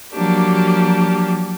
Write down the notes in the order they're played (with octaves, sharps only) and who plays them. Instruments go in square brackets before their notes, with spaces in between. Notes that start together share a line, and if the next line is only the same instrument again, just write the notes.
[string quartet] F3 F#3 A#3 D4 G4